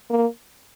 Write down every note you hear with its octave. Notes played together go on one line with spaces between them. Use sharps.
A#3